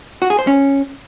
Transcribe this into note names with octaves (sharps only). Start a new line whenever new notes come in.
F#4
G#4
C5
C#4